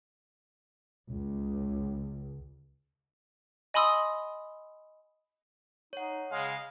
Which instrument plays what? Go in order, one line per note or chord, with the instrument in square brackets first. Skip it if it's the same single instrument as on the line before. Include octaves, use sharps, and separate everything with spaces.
[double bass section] C#2
[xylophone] D#5 G#5 B5 C6 D#6 E6
[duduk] D#4 [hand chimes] C#5 F#5
[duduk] C#3 [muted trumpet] G#3 [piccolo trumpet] F5